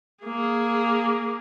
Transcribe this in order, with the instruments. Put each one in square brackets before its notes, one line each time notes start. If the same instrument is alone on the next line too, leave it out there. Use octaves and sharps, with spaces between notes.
[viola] A#3 G#4